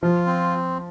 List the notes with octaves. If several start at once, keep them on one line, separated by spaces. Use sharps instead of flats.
F3 F4
C4